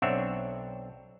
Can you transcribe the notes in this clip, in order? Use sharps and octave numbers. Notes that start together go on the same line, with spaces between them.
B1 C4 D4 C#5 E5 F#5